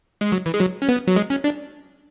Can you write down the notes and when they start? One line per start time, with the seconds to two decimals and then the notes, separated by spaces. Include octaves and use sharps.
0.21 G#3
0.32 F#3
0.46 E3
0.54 G#3
0.60 F#3
0.82 C#4
0.89 B3
1.08 F#3
1.16 G#3
1.30 C#4
1.44 D4